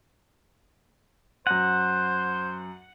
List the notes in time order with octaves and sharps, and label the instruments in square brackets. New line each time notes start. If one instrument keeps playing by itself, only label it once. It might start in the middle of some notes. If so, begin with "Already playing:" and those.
[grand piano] F#2 A#6 D#7 [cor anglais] C5 [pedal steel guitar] F#5